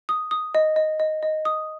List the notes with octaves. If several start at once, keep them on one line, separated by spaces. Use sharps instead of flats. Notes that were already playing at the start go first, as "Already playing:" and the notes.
D#6
D#6
D#5
D#5
D#5
D#5
D#6